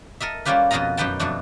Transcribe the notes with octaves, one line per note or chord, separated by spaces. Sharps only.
A4 A#4 D#5 E5
G3 A#3 C#4 F4 G4 B4
F2 B2 B3 F4 D#5 A#5
F#2 D#4 G4 B4 G5 A5
F2 B2 A3 D4